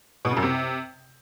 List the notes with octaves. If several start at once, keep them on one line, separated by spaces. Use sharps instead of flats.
B2
C#3
F#2
C3